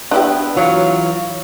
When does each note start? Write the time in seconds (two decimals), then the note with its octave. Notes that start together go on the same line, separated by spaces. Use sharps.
0.11 B3 D4 E4 G4
0.56 E3 F#3 F4 F5